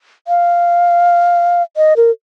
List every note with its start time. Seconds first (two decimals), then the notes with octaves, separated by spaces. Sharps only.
0.28 F5
1.77 D#5
1.97 A#4